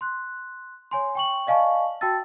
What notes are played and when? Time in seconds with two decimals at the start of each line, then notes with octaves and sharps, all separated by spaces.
0.01 C6 F#6
0.91 C#5 G#5 C6
1.15 G5 C#6 F#7
1.47 D5 D#5 F5 G#5 A5 C#6
2.01 F#4 G5 A5 E6 A6